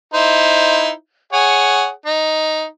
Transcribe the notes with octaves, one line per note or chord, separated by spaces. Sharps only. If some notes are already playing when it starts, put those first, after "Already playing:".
D#4 E4 C5
G#4 C#5 F#5
D#4